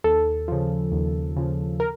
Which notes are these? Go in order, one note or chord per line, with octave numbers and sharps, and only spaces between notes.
D#2 A4
C#3 F3
D#2
C#3 F3
A#4